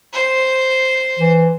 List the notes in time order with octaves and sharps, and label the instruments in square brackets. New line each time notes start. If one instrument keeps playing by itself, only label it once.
[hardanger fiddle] C5
[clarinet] E3